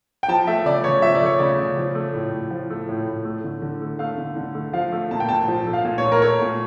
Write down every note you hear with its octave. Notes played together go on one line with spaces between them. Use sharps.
G5
F3 A5
A3 E5
C#3 D5
C#3 C#5
F3 E5
D5
A3 C#5
C#3 D5
C#3
F3
A3
A2
A2
F3
A3
A2
A2
A3
D3
D3
A3
A3 F5
D3
D3
A3
F3 F5
A3
A#2 A5
G5
A#2 A5
F3
A3
F5
A#2
C#5
A#2
A#4
A3 C#5
A#2